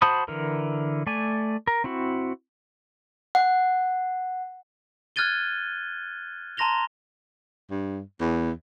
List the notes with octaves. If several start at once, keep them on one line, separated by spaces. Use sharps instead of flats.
F#4 C5 A5 B5 D#6
D3 E3 A#4
A3 D5 G#5
A#4
C4 E4 F#4
F#5
F6 F#6 G#6 A6 D#7 G7
A5 A#5 C6 A#6 F7 G7
G2
E2